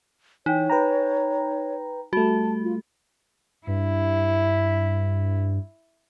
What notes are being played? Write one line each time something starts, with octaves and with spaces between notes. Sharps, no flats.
E3 D#4 C#5 G5
B4 G5 A#5
G3 A3 F#4 A5
F4
G2 E4